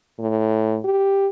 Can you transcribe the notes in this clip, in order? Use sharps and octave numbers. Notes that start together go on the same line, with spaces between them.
A2
G4